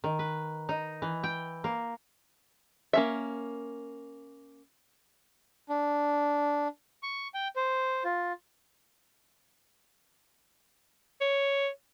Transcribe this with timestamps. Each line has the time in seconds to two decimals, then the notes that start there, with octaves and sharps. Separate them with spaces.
0.04 D#3
0.19 B4
0.69 D#4
1.02 E3
1.23 G5
1.64 A#3
2.93 A#3 C#4 E5
5.69 D4
7.03 C#6
7.34 G5
7.56 C5
8.05 F4
11.21 C#5